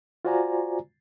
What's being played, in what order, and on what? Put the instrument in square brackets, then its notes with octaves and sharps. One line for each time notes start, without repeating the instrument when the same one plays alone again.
[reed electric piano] F4 F#4 C5 D5 G#5 A#5